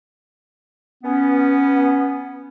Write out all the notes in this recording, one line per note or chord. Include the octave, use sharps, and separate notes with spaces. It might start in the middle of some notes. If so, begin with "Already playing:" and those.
B3 C#4